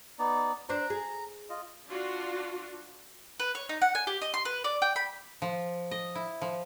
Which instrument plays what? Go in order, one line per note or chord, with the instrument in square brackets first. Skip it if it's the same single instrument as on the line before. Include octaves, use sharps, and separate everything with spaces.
[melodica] B3 D#4 D5
[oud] D4 C5 D5 [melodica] A#5
[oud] G#4
[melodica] F4 D#5
[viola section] D4 F4 F#4
[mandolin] B4
C#5
D#4
F#5
G#5
G4
D#5
C6
B4
D5
G5
B5
[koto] F3
D#5
E4
F3